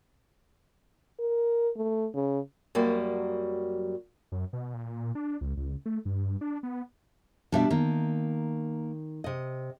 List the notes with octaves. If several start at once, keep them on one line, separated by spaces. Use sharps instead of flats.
A#4
A3
C#3
F#2 F#3 G3 A#3
F#2
B2
A#2
A#2
D4
C#2
C#2
A3
G2
D4
B3
B2 G3 D4 G4 E5
D#3 A#3
C3 D#5